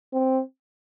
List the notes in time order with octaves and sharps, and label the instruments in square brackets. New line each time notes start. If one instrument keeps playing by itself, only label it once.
[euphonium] C4